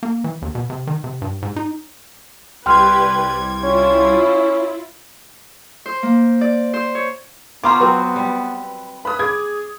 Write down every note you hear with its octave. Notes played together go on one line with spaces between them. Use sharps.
A#3
E3
D#2
B2
C3
D#3
C3
G2
G#2
D#4
C2 G3 G4 B4 G5 C6 F6 G#6
C#4 E4 F4
C5
A#3
D5
C5
C#5
B3 C#4 F4 C5 A#5 C6 D6
F#3 C4 B4
G3
B4 B5 D#6
G#4 D6 G#6